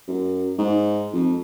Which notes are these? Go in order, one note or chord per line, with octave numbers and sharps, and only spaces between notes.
F#2
G#2
F2